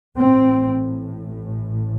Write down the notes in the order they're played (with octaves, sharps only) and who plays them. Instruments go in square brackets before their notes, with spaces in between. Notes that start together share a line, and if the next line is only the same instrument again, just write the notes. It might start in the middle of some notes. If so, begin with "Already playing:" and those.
[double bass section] A1 A2 C4